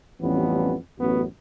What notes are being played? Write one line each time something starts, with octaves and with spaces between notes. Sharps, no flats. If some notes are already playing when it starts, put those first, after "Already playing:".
A1 F2 E3 G3 B3 C#4
A1 F#2 B3 F#4